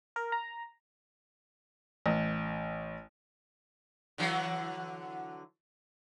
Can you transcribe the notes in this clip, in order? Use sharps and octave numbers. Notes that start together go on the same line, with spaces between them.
A#4
A#5
A1
D3 E3 F#3